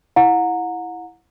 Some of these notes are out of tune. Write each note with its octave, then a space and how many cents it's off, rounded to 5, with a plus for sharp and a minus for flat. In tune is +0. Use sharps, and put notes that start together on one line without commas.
E4 +0 F#5 -30 A#5 -10